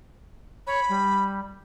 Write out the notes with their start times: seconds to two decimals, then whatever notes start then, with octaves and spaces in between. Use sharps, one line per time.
0.67 C#5 B5
0.89 G3